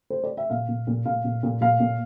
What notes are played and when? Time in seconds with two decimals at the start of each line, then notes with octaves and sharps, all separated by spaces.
0.10 C5
0.24 D5
0.37 E5
0.50 A#2 F5
0.68 A#2
0.87 A#2
1.05 A#2 F5
1.25 A#2
1.43 A#2
1.61 A#2 F5
1.80 A#2